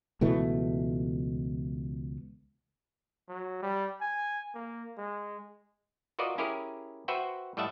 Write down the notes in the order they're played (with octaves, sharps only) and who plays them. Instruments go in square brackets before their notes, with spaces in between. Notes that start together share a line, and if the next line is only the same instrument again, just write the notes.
[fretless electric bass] C#2 B2 E3 A3
[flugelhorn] F#3
G3
G#5
A#3
G#3
[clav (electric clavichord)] F4 F#4 A#4 B4 D5 D#5
C#4 E4 G4 G#4 A#4
F#4 B4 C5 E5 F#5 G5
A2 G3 D#5 E5 F#5 A5